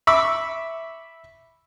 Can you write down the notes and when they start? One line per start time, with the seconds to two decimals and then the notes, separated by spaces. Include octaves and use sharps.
0.07 E5 B5 C#6 D6 E6